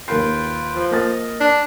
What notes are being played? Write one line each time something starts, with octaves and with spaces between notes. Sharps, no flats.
D#2 F4 A#4 B4 G5 C7
F3
A#3 D#5 F6 A6
D4